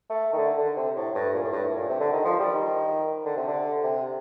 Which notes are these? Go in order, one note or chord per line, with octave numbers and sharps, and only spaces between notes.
A3
D#3
D3
D3
C3
A2
G2
A#2
A2
G2
A2
A#2
C3
D3
D#3
F3
G3
D#3
D3
C3
D3
C3